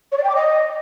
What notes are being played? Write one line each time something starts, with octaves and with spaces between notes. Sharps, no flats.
C#5
D5
G5
D6
D#5